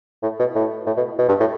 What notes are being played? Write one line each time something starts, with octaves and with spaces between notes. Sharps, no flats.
A2
B2
A2
A2
B2
B2
G2
A2